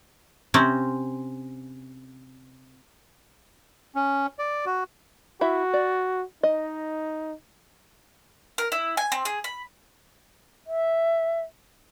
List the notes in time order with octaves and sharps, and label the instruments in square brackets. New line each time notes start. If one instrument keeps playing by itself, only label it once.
[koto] C3 C4 C#4
[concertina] C#4
D5
F#4
[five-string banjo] E4 E5 [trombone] F#4
[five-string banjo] D5
[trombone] D#4 [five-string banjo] D#5
[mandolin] A#4
E4
G#5
C4
G#4
B5
[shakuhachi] E5